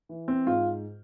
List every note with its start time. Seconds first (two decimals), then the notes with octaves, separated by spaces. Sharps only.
0.09 E3
0.28 C4
0.46 G#2 F4